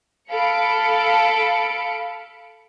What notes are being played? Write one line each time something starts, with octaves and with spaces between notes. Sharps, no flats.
A4 F5 B5 C#7 D7